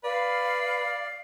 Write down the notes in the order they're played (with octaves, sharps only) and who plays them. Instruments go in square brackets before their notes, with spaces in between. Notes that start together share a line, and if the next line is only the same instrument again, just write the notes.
[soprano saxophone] B4 [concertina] D5 [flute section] F5